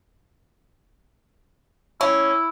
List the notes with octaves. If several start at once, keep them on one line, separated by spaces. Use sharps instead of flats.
C#4 E4